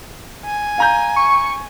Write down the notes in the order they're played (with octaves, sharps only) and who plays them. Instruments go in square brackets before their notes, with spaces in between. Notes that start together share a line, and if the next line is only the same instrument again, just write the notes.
[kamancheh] G#5
[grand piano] F5 A#5 G6
[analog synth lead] C#6